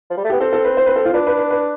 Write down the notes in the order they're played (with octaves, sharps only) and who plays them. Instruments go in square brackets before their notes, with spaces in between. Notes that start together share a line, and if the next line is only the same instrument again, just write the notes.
[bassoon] F3
G3
A3
[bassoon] B3 [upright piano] G4
[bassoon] C4 [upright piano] A4
[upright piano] A4
B4
C5
B4
A4
F4
[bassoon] D4 [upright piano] B4
[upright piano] B4
B4
B4